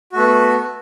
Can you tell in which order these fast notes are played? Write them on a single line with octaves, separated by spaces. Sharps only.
F#4 A3 B3